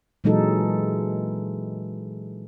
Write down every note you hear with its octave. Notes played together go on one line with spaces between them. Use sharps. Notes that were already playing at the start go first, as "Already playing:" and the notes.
A#2 E3 F#3 G#3 D#4 A4